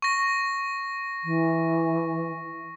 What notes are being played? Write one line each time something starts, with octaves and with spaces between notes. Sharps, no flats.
C#6 A#6
E3